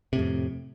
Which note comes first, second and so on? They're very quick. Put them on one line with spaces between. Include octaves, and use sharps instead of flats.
C3 A2 F2